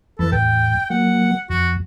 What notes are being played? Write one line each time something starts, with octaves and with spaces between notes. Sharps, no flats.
F2 E3 A4 B4
E2 A2 G5
F#3 A#3 F#5
F2 F#4